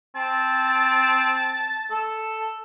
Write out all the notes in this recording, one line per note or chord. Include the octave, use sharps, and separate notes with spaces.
C4 A5
A4